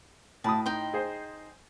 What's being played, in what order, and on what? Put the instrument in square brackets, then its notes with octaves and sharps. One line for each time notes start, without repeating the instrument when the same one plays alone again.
[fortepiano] A2 B5 D#6 [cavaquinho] A5
[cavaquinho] D#4 G5 C6
[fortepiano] G#4 C5